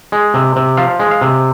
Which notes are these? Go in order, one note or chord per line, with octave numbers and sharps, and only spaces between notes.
G#3
C3
C3
F3 F5
G#3
F5
C3